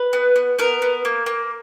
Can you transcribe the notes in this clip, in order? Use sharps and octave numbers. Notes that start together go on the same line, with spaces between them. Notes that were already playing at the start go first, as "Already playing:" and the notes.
Already playing: B4
B3
B3
B3 A#4
B3
A#3
A#3